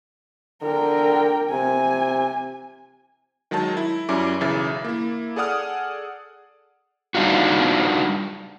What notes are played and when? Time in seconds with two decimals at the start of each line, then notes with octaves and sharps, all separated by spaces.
0.62 D3 A#4 G5
1.50 C3 G#5
3.51 D#3 F#3 G#3 D#4 A5
3.77 E4
4.09 F#2 G3 C#4 E4 D6
4.41 B1 C#3 E3 G#4 E5 A6
4.84 A#3 E4
5.36 G#4 A4 D5 F#5 D#6 F6
7.15 G3 D4 D#4 F4 F#4